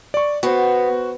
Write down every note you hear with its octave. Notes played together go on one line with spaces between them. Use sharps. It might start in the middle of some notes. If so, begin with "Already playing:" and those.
D5 C#6
B3 F#4 C5